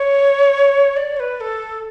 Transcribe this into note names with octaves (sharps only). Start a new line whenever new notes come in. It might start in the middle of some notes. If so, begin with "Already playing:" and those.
Already playing: C#5
D5
C#5
B4
B4
A4